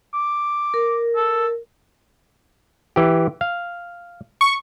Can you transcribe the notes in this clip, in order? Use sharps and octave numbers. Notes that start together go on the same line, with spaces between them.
D6
A#4
A4
E3 G4
F5
C#6